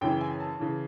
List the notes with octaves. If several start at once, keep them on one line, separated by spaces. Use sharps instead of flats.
F#2 C#3 E3 G5
G#5
A5
C#3 E3